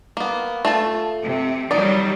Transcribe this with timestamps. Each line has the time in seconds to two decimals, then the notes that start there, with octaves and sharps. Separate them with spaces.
0.17 A#3 B3
0.65 A3 F4 A5
1.24 C3
1.71 D#3 F#3 G3 D#4 D5